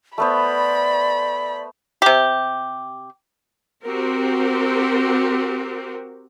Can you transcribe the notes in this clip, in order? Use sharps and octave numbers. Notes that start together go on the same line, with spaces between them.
A3 B3 C5 D5 B5
C3 G4
C4 F#4 G4 A#4